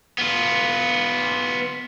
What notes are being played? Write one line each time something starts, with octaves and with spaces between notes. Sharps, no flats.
B3 F4